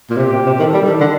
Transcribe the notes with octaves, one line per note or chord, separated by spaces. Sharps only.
A#2
C3 G4
A#2
C3
D#3 A4
G3
D#3
D3